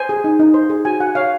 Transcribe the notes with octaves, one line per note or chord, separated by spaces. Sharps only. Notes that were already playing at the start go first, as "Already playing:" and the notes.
Already playing: C5 G#5
G#4
D#4
D#4
C5
G#4
F#4 G#5
F#4 F#5
C#5 F5